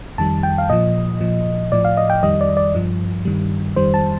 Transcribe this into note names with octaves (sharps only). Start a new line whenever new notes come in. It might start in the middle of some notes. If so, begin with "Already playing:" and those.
F2 D#3 G3 A5
G5
F5
A#2 F3 D#5
A#2 F3
A2 F3 D5
F5
D#5
G5
F2 D#3 G3 D#5
D5
D5
G2 F3
G2 D#3 G3
F2 D#3 G3 C5
A5